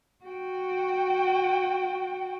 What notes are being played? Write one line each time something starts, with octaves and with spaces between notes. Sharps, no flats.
F#4 G5